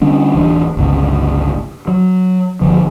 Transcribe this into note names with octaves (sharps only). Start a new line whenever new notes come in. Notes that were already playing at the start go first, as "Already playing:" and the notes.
D3 G3 C#4 D4
D1 E3 D4
G1 C#2 C#3
F#3
G1 D3 F3